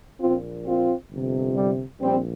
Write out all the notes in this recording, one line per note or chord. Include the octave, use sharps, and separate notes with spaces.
A#1 A#2 C4 F4
C4 F4
G1 F2 C3
G3
A#1 G3 C4